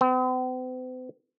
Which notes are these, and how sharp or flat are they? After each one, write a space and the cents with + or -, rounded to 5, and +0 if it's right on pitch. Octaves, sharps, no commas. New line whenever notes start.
C4 -45